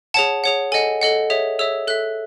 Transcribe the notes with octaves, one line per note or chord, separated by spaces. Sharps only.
G#4 C#5 F#5 A5
G#4 C#5 F#5
A4 D#5 F#5 G#5
A4 D#5 F#5
G#4 C#5 E5
G#4 C#5 E5 E6
A4 E5 F#6